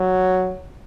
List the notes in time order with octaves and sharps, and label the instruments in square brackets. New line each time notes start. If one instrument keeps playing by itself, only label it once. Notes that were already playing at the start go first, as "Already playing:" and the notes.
Already playing: [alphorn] F#3